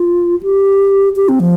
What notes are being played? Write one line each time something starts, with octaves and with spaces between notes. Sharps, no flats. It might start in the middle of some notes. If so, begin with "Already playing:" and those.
Already playing: F4
G4
G4
C4
F3